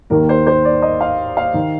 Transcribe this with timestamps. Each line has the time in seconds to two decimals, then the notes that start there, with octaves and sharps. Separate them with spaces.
0.10 D#2 D#3 A#4
0.29 C5
0.47 C5
0.65 D5
0.82 D#5
1.01 F5
1.37 F5
1.54 D#3